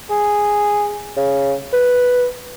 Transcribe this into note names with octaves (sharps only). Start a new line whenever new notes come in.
G#4
C#3
B4